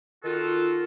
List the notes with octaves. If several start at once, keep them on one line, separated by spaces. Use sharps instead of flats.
D#3 F4 F#4 A4